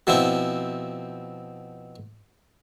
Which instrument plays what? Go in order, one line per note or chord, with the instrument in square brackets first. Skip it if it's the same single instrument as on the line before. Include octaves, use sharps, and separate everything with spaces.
[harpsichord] B2 F3 C4 E4